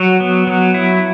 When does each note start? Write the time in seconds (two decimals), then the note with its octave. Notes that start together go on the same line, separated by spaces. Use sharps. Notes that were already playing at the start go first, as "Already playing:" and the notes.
Already playing: F#3 F#4
0.20 B3
0.47 F#3
0.74 E4